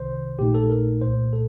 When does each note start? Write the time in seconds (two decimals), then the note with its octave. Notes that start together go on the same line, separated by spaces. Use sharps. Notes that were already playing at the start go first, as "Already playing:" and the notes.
Already playing: C2 C3 D#3 C5
0.38 A#1 A#2 A3 D#4 G4
0.54 A4
0.70 A#4
1.01 C2 A#2 A3 C5
1.33 A4